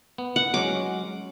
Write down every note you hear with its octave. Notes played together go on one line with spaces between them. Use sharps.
B3
F#5
F#3 G#3 C#4 D6